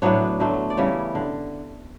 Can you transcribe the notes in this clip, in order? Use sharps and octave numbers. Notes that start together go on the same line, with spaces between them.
A2 F#3 B3 D4 C#5
D3 F#3 A3
D5
C#3 E3 G3 C#5
D3